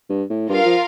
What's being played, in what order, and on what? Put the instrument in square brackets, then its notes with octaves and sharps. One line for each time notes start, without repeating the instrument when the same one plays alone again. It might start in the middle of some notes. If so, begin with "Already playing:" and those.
[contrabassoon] G2
A2
[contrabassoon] G2 [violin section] F4 A#4 F5
[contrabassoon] F3